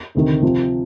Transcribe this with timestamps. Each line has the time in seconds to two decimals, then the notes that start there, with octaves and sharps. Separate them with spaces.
0.15 D2 C3 D#3
0.42 C3 F3 C4